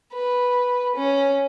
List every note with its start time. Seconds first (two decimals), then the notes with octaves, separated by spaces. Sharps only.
0.12 B4
0.95 C#4